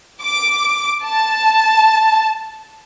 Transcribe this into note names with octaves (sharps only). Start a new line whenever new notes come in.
D6
A5